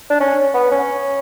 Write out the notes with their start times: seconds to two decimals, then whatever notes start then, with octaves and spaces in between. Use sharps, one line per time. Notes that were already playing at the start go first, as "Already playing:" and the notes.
0.10 D4
0.20 C#4
0.54 B3
0.71 C#4